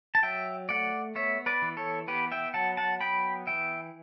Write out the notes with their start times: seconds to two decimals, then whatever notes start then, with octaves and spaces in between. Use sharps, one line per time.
0.15 A5
0.23 F#3 E5 G5
0.69 A3 D5 F#5
1.15 B3 C#5 E5
1.46 B4 D5
1.62 E3
1.77 A4 C#5
2.08 B3 G4 B4
2.32 E5 G5
2.54 F#3 F#5 A5
2.77 F#5 A5
3.01 B3 G5 B5
3.47 E3 E5 G5